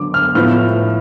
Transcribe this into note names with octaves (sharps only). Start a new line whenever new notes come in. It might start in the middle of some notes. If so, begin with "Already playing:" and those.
Already playing: D3 F#3 D6
F6
A2 F3 B3 F6